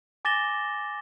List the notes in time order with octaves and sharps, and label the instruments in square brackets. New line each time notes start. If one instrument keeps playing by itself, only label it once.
[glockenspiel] G#5 D6 A6 A#6 E7 G7